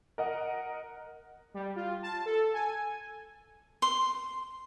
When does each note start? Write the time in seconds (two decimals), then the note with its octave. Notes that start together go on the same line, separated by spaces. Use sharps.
0.18 A#4 D#5 F#5
1.54 G3
1.76 F4
2.03 A5
2.26 A4
2.54 G#5
3.82 C6